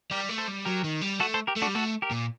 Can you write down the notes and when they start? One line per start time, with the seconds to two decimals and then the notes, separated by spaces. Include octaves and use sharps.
0.11 G3 G4 A#4
0.29 A3
0.38 A4 C5
0.48 G3
0.65 F#3 G4 A#4
0.84 D#3
1.02 G3
1.20 A3 F#4 A4
1.34 A4 C5
1.47 G4 A#4
1.57 A3
1.62 D4 F#4
1.67 G3
1.75 A3 F#4 A4
2.02 G4 A#4
2.11 A#2